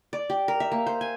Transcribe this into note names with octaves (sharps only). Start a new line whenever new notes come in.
D5
G4
A#4
E5
A#3
C5
G#5